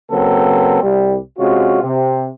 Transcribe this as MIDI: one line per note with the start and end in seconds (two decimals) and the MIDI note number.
0.10 0.79 49
0.10 0.79 54
0.10 0.79 58
0.10 0.79 60
0.10 0.79 69
0.10 0.79 71
0.82 1.17 36
0.82 1.17 55
1.39 1.81 48
1.39 1.81 56
1.39 1.81 61
1.39 1.81 65
1.39 1.81 66
1.82 2.27 48